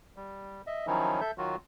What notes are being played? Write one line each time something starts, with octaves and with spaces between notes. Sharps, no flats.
G3
D#5 E5
D#3 F3 F#3 C#4 D#4 E4
A4 E5 G6
D#3 F#3 F4 F#4